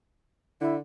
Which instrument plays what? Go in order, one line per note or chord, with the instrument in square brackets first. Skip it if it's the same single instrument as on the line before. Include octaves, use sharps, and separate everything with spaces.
[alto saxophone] D3 [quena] E4